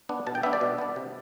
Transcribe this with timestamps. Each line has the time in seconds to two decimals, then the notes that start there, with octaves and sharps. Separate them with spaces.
0.09 B3 D4
0.27 B2 A5
0.35 G5
0.43 B3 D4 E5
0.53 D5
0.61 B2
0.78 B3 D4
0.96 C3